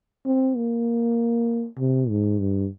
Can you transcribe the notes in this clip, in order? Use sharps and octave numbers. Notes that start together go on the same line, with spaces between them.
C4
A#3
C3
G#2
G2